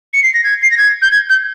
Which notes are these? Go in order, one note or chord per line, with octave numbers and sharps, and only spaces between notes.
C#7
C7
A#6
G#6
C7
A#6
G#6
G6
G#6
G6